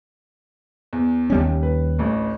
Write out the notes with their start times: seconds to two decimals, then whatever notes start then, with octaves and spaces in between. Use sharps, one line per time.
0.93 E2
1.30 D#2 G3 C#4
1.63 B4
1.99 A1 D2